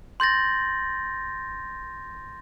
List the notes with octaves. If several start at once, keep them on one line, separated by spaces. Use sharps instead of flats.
C6 G6 A6 A#6